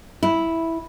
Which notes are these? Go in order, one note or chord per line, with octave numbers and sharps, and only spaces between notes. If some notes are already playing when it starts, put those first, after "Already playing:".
E4